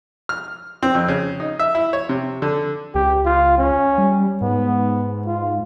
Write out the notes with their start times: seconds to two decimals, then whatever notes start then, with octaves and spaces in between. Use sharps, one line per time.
0.29 F6
0.83 C4
0.95 F2
1.08 C#3
1.40 D#4
1.59 E5
1.75 E4
1.93 C#5
2.09 C3
2.42 D3
2.95 C#2 G4
3.25 F4
3.58 C#4
3.98 G3
4.41 G#2 B3
5.27 F4